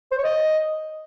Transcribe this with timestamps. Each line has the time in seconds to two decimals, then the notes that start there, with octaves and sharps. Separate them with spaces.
0.11 C5
0.18 C#5
0.24 D#5